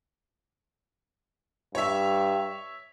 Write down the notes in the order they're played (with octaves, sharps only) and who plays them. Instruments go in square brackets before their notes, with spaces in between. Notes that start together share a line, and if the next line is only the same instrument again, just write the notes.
[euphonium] G2 [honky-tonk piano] C#5 E5